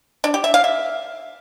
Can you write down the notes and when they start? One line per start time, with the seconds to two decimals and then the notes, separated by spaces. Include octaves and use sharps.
0.24 D4
0.34 G4
0.44 E5
0.54 F5
0.64 E5